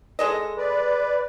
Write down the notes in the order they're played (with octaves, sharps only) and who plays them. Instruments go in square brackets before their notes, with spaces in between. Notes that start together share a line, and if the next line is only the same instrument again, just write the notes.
[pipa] G#3 A4 D#5
[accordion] B4 D5